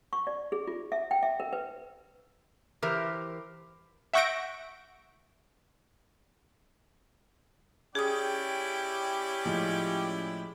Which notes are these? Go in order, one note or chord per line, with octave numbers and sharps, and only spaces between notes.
C#6
D5
G#4
F4
E5
G5
E5
A#4
B4
E3 G4 A#4 C5
E5 F#5 C#6 G6 A#6 D7
C#4 E4 G4 G#4 D5 G5 D#6
A2 F3 G#3